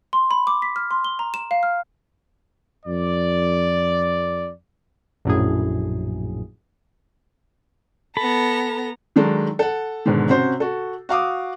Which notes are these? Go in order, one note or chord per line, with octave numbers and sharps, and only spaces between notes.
C6
B5
D6
B6
F6
C6
G7
A#5
E7
F5
F6
F2 D5
A#1 F#2 A2 G#4
B3 A4 A#5 B5
D#3 F#3 G#3 D4 A4
A4 F#5
G#2 B2 D3 D#3 G#3
C3 C#4 F#4 C5
F#4 A4
F#4 F5 D6 D#6